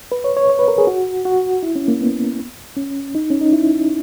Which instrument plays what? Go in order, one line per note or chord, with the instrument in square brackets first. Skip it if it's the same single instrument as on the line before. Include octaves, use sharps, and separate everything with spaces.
[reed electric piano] B4
C#5
C#5
C#5
B4
A#4
G#4
F#4
F#4
E4
C#4
A#3
B3
C#4
D#4
C#4
D#4
E4